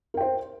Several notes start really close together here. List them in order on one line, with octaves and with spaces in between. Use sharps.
A#4 G5 C5